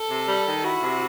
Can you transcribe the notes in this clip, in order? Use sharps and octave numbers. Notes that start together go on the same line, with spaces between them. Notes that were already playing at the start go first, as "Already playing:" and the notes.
Already playing: A4
C3
G3
D#3
E4 F#4
C3